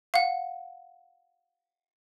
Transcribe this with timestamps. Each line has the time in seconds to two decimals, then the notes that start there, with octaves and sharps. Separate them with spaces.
0.14 F5 F#5